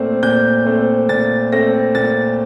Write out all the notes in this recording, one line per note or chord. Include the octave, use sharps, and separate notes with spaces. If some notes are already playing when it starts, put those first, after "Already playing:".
Already playing: A#2 A3 C4
A#2 G6
A3 C4
A#2 A6
A3 C4 A#6
A#2 A6